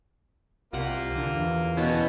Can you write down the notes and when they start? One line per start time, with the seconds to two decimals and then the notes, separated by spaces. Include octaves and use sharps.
0.73 C2 A#3 F4 G4 F#5
1.16 D3
1.35 E2
1.77 B2 B3 C#4 E4 C#5 A5